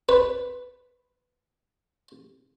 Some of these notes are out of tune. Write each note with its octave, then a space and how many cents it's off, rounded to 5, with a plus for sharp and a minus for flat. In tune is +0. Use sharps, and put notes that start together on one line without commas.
B4 +5